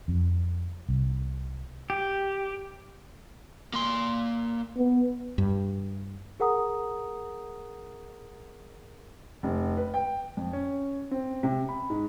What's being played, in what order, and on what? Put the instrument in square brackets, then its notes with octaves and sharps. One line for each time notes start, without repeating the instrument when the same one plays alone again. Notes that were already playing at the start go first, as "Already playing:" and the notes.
[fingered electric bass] F2
C2
[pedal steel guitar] G4
[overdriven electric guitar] A#3 C6
[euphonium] B3
[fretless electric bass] G2
[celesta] G#4 A#4 F#5 A#5 D#6
[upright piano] F1
B4
G5
F2
C#4
C4
C3
B5
G#2